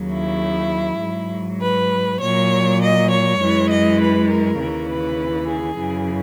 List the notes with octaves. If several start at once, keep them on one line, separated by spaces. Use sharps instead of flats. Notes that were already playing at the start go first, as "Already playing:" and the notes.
Already playing: D#2 C#3 F#3
E4
G#2 F#3
B4
A#2 F#3 C#5
D#5
C#5
F#2 E3 G#3
D#5
B4
A#4
D#2 C#3 E3
B4
G#4
F#2 C#3 E3